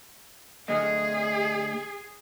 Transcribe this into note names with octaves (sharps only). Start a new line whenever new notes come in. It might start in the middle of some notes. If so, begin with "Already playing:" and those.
D2 A3 G#4 D#5